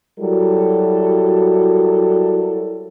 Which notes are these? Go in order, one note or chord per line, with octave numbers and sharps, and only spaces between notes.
F#3 G3 E4 F#4 A4 A#4